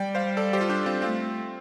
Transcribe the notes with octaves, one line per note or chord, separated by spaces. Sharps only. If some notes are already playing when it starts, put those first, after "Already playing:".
Already playing: G3 D5 G5
C5 F5
A4 D5
G4 C5
F4
D4 G4
C4 F4
A3 C4 F4